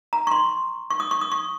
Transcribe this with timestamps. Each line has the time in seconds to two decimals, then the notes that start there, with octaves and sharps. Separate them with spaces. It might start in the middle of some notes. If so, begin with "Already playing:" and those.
0.13 A#5
0.27 C#6
0.31 C6
0.90 C#6
1.00 D#6
1.11 C#6
1.21 D#6
1.32 C#6